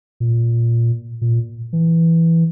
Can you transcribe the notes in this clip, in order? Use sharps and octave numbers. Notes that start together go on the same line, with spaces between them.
A#2
A#2
E3